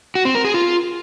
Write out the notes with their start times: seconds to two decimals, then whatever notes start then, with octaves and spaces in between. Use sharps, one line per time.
0.15 F#4
0.25 C4
0.35 A#4
0.45 G#4
0.54 F4